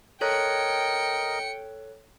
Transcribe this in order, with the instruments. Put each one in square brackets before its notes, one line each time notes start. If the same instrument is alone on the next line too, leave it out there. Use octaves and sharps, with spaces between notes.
[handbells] A4 C#5 F#6 [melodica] A#4 D#5 [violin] G5 C#7